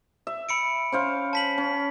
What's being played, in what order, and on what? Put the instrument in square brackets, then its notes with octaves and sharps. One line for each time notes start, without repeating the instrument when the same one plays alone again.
[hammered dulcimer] E5
[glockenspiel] B5 C#7 D7
[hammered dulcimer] C#4 C5 F5
[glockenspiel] A5 B6 F#7
[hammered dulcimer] C#4